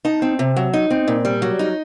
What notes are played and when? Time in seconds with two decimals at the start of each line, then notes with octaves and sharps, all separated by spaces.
0.05 D#4 A5
0.22 C4
0.39 C3
0.56 F#3
0.73 D#4
0.91 C4
1.08 A#2
1.25 G3
1.42 F#3
1.59 D#4